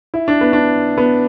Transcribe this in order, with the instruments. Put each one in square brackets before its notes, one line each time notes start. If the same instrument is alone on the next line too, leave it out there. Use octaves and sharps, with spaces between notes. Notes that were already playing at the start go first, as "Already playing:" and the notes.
[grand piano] E4
D4
B3
D4
B3